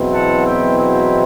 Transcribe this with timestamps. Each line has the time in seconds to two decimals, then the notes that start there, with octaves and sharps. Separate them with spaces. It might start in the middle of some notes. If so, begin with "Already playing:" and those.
Already playing: E2 B2 F#3 C4 E4
0.14 F#5 A5
0.46 E5 G5
0.77 E5 G5